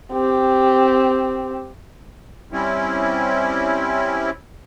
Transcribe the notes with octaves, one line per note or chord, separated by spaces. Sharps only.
C4 G4
G3 C4 C#4 E4